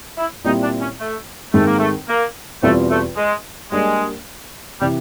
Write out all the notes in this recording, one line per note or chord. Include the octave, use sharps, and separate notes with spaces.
E4
A#2 G3 C4 D#4 E4 G4
D4
C#4
A3
G#2 D#3 G#3 A3 C4
A#3
A3
A#3
E2 B2 G3 A3 C4 F4
A3
G#3
G3 G#3 A#3 D4
C3 E3 G3